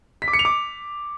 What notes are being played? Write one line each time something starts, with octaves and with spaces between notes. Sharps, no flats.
B6
D6
C#7
F7
D6